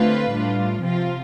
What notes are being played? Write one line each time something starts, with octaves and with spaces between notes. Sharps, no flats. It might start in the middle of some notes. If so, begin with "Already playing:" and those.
Already playing: D3 A3 C4 F4 B4
A2 G3 D4 F4
C3 F3 C4 F4